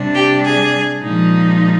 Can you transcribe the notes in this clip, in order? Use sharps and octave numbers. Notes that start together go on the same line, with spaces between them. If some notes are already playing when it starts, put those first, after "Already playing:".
Already playing: C3 G3 D4
G4
G#4
A#2 F3 G#3 D#4